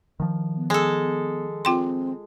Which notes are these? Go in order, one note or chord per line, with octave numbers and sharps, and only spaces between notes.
D#3 F3
B3
G#3 A4
C4 F4 G5 C6